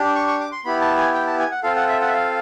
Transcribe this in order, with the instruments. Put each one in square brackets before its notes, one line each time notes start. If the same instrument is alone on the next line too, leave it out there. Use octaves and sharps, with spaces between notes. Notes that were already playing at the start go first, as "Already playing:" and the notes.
Already playing: [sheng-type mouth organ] D4 G4
C#6
C#6
D6
C6
B3 E4 G4 B5
A5
G#5
G5
A5
G#5
F#5
C4 F4 A4 F5
F#5
E5
F#5
E5
F5